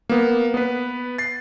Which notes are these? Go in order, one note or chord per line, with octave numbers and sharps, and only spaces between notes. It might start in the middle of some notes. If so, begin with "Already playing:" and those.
A#3 B3
B3 B4
A6 C7